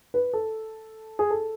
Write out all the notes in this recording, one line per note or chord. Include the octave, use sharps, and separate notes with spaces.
B4
A4
G#4
A4